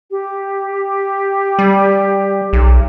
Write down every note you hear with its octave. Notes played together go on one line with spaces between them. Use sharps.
G4
G3
B1